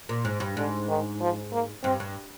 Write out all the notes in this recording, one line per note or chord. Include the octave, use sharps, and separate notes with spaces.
A#2
G#2
G2
G#2 D3
D#3
F3
A#3
G2 C4
G2